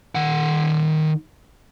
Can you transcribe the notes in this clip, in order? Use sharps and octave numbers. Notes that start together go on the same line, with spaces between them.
D#3 F#5